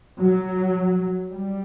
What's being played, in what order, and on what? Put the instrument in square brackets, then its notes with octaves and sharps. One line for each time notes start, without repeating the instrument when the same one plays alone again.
[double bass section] F#3
G3